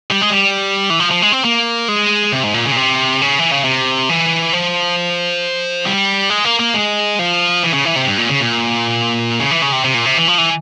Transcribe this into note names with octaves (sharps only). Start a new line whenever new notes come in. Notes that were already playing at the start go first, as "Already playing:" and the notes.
G3
G#3
G3
E3
F3
F3
G#3
C4
A#3
G#3
C3
G#2
A#2
C#3
A#2
C3
C#3
E3
C#3
C3
E3
F3
G3
G#3
A#3
A#3
G#3
F3
E3
C#3
E3
C3
G2
A#2
C#3
A#2
C#3
E3
C#3
C3
C3
A#2
C3
E3
F3
E3